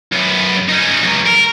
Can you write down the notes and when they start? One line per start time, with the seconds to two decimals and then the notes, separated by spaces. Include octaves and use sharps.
0.12 F#2 B3
0.69 C#4 D#4
1.03 C#2 F#3
1.26 A#4